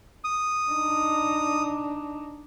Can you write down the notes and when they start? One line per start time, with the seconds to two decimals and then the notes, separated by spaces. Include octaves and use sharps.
0.24 D#6
0.70 D4 D#4